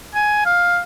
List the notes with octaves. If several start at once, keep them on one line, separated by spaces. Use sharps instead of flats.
G#5
F5